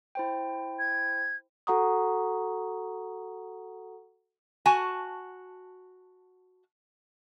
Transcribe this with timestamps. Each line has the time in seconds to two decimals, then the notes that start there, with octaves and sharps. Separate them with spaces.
0.15 E4 C5 G5
0.79 G#6
1.67 F#4 A4 F#5 A#5 C#6 D#6
4.66 F#4 G#5 A5